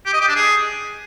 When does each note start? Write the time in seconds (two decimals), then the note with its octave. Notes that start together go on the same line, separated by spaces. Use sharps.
0.06 G4
0.13 D#5
0.21 G4
0.28 D4
0.36 G#4